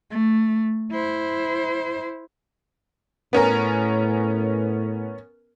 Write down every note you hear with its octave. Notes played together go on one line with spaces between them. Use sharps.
A3
E4 C5
A2 B3 C#4 A#4